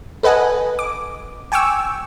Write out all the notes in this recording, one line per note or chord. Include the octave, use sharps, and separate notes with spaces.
A4 B4 D#5 F#5 G#5
D6
G5 G#5 C#6 D6 E6